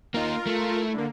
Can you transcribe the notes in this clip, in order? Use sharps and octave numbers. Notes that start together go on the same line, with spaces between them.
A#3 D#4 F4 A#4
A3
E4
D3 A#3